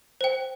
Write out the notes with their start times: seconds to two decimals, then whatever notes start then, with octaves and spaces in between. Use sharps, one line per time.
0.21 C5 G5